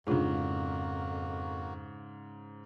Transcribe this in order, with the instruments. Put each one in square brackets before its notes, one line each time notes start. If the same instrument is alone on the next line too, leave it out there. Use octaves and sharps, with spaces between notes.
[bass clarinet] F2 [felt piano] G#2 C#3 [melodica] A#3 F#4 [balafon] D4 F4 G#4